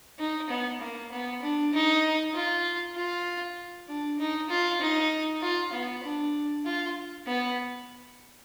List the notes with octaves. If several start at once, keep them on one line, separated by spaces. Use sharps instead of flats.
D#4
B3
A#3
B3
D4
D#4
F4
F4
D4
D#4
F4
D#4
F4
B3
D4
F4
B3